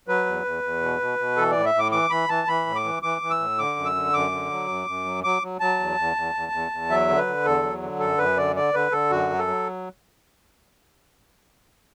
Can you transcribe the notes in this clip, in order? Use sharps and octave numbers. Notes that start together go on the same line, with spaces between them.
F#3 B4
E2
E2
E2
B2
B2
B2
E3 A4
A2 D5
E5
A2 D6
E3 D6
E3 B5
E3 A5
E3 B5
A2
D6
E3
E3 D6
E3
E6
A2
D3 D6
F#2
E6
D3
F#2 D6
D3
F#3
F#2
F#2
F#3
F#3 D6
F#3
F#3 A5
E2
E2
E2
E2
E2
E2
F#3 E5
D3
B4
D3
E2 A4
F#3
D3
F#2 A4
F#2 B4
D3 D5
D3 D5
D3 B4
D3 A4
F#2 F#4
F#3
A4
F#3